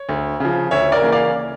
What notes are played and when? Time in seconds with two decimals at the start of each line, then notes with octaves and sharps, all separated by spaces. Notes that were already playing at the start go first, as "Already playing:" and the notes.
Already playing: C#5
0.09 D2
0.40 C#3 F3
0.71 D2 C#5 E5
0.92 A#4 D5
1.02 C#3 E3 A#3
1.12 D5 F5